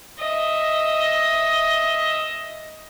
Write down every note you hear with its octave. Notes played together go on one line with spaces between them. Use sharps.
D#5 E5